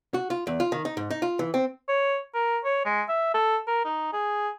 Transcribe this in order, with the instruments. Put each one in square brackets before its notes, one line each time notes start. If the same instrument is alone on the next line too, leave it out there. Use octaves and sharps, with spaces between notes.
[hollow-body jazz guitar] F#4
F4
E2
F4
D#3
D#4
G#2
D#4
F4
E3
C4
[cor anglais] C#5
A#4
C#5
G#3
E5
A4
A#4
D#4
G#4